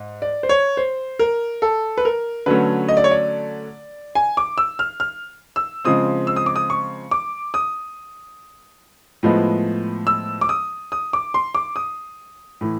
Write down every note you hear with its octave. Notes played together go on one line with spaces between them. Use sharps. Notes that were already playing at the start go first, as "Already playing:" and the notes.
Already playing: G#2
D5
C5
C#5
C5
A#4
A4
B4
A#4
D3 F#3 A3 C#4 B4
D#5
D5
C#5
D5
G#5
D6
E6
F6
F6
E6
C#3 F3 G#3 C4 D#6
E6
D#6
D6
D#6
C#6
D6
D#6
A2 F3 G#3 B3
E6
D6
D#6
D#6
D6
C6
D6
D#6
A2 E3